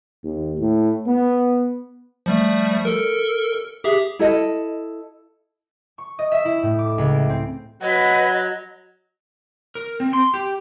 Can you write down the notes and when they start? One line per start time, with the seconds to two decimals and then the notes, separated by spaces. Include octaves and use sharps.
0.24 D#2
0.59 A2
1.07 B3
2.26 F3 G3 A3
2.85 A4 A#4
3.84 G4 G#4 E5
4.19 E4 A4 D#5
5.98 C#6
6.19 D#5
6.32 E5
6.45 E4
6.63 A2
6.79 D6
6.98 C#2
7.14 D7
7.29 C4
7.82 F#3 B4 D#5 F#5
9.75 A#4
10.00 C4
10.13 C6
10.34 G4